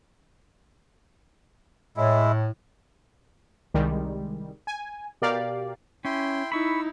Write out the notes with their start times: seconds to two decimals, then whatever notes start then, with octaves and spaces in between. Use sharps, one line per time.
1.97 A2 G#3 E4
3.74 C2 D#3 G3 G#3
4.67 G#5
5.22 B2 G4 A#4 D5 F5
6.05 C#4 E4 G5 C6
6.52 D#4 E4 B5 C#6 E6